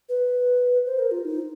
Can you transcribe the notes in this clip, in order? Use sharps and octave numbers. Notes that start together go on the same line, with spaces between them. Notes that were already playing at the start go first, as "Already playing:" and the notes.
B4
C5
A#4
F4
D#4